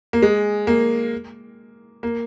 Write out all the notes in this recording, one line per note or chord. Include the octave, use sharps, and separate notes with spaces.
A#3
G#3
A#3
A#3